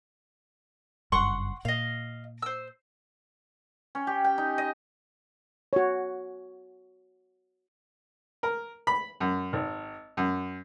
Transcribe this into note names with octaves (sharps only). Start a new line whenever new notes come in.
F#1 G2 F#5 C6 C#6
A#2 D#5 F5
C5 E6
C#4
G4
G5
D#4
D#5
F#4 C#5
A#4
B5
F#2
G#1
F#2